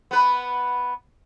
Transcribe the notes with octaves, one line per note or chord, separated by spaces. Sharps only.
B3 B4